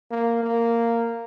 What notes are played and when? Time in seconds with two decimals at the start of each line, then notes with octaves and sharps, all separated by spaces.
0.11 A#3
0.43 A#3